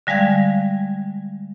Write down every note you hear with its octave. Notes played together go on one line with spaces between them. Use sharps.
D3 G3 G#3 F5 G#6